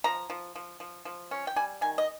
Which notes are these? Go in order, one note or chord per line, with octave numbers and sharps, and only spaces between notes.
F3 A#5
F3
F3
F3
F3
C#4
G5
G3 G#5
D#3 G#5
D#5